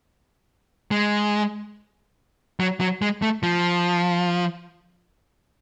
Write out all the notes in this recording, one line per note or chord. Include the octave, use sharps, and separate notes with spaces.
G#3
F#3
F#3
G#3
A3
F3